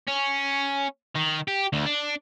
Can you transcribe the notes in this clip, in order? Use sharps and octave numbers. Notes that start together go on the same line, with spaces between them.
C#4
D#3
G4
D2
D4